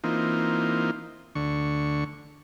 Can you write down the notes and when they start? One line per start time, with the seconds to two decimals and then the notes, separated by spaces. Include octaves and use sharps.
0.04 E3 A#3 C4 D#4 F4
1.35 D2 D3 C#6